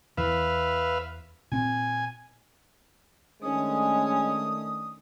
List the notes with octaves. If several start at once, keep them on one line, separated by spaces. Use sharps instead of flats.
E2 E3 B4 E5 F5
A#2 C4 G#5
D#3 G#3 A3 C#4 D4 D#6